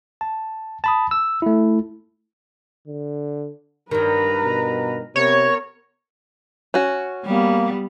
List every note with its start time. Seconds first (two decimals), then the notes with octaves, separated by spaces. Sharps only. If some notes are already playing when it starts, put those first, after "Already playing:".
0.21 A5
0.84 A5 B5 D#6
1.11 E6
1.42 A3 E4
2.88 D3
3.91 G2 D#3 A#4 B4 A#5
4.45 B2
5.16 C3 B3 A#4 C#5
6.74 C#4 F#4
7.25 G3 A#3 B3